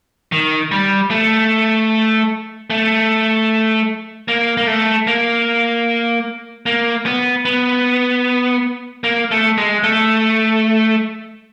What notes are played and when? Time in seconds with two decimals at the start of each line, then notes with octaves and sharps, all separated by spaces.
0.32 D#3
0.71 G3
1.11 A3
2.70 A3
4.28 A#3
4.57 A#3
4.67 A3
5.07 A#3
6.66 A#3
7.06 B3
7.45 B3
9.04 A#3
9.31 A3
9.58 G#3
9.84 A3